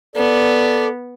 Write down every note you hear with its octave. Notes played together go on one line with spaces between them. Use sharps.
B3 A4 D5